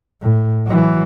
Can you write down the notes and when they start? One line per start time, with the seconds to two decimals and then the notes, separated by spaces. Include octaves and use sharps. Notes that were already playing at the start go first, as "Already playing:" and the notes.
0.22 A2
0.66 E3 F#3